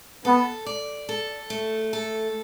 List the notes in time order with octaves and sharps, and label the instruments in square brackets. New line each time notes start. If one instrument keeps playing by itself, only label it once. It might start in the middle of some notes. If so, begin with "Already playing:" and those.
[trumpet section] B3 [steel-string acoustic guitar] A4
[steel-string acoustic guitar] D5
A4
A3
A4